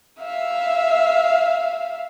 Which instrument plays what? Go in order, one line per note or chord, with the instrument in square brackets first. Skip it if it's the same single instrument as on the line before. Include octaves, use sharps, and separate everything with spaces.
[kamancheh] E5 F5